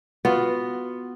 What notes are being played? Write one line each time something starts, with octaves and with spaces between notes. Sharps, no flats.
B3 F4 F#4